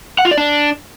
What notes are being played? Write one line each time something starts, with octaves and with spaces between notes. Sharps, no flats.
F#5
F4
D5
D4